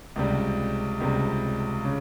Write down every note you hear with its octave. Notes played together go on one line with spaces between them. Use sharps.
C#2 C3 G3
C#2 C3 G3
C#3